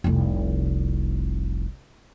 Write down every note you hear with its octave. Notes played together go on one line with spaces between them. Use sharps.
F1 C2